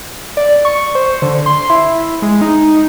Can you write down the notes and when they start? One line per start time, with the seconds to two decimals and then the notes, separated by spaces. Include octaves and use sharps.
0.37 D5
0.65 C#6
0.95 C5
1.22 D3
1.46 C6
1.70 E4
2.22 G#3
2.41 D#4